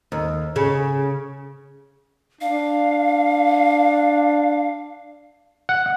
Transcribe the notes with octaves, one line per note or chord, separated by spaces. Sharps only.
D#2
C#3
D4 F5
F#5